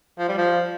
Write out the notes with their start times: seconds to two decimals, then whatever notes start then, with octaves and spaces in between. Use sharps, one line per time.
0.18 F3
0.29 G3
0.38 F3